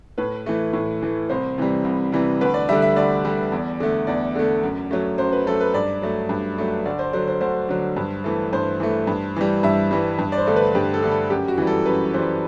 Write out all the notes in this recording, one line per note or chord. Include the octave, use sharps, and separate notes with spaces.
A2 B4
E3 A3
A2
E3 A3
C2 C5
C3 E3 G3
C2
C3 E3 G3
D2 B4
D5
D3 G3 E5
E5
D2 D5
D3 G3
E2
D3 A3
E2 D5
D3 A3
F#2
F#3 A3
F#2 C5
B4
F#3 A3 A4
B4
G2 D5
F#3 A3
G2
F#3 A3
D2 D5
C5
D3 F#3 C5
C5
D2 C5
D3 F#3
G2
E3 A3
G2 C5
E3 A3
G2
E3 G3
G2 E5
E3 G3
G2
D5
C5
D3 A3
B4
G2 G4
A4
D3 A3
A4
F#2 G4
F#4
E3 G3
A4
F#2 B4
E3 G3 C5